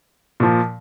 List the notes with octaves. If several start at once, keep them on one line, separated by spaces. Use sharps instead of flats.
A#2 F3